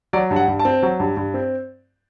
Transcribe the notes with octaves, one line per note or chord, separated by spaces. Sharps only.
F#3 D5
G2
F#5
G2
A5
C4
F#3
G2
G2
C4